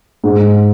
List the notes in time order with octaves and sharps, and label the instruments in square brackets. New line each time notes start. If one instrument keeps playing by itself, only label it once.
[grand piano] G#2